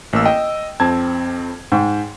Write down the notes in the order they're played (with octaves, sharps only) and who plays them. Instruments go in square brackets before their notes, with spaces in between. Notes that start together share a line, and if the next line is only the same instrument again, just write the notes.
[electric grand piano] A1 A#3 E6
[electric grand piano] D#5 [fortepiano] G5
[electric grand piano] F2 C4 G#6 [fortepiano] A5
[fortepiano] G#2 [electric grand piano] G5